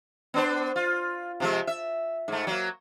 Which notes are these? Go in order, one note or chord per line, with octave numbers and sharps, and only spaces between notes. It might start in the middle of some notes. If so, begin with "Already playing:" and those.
B3 D4 C5
F4
C3 F3 G#3
E5
G#2 A3
F#3 A#3